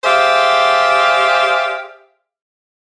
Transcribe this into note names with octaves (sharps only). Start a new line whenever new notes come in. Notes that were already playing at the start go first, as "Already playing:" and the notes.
G4 G#4 C5 D5 E5 F5